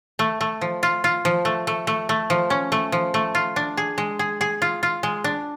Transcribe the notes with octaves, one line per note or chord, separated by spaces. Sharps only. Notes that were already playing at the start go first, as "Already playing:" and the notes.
A3
A3
F3
F4
F4
F3
A3
A3
A3
A3
F3
C#4
A3
F3
A3
F4
D4
G#4
G#3
G#4
G#4
F4
F4
G#3
D4